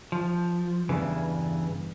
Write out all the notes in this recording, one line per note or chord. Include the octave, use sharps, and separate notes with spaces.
F3
E2 G2 C#3 E3